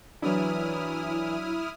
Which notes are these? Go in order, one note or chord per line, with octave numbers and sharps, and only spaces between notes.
E3 F#3 D4 E4 D#6 F6